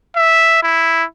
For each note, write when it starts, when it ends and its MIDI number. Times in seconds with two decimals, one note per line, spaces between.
0.16 0.58 76
0.63 1.04 64